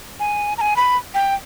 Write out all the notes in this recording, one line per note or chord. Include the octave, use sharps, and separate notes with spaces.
G#5
A#5
G#5
B5
G5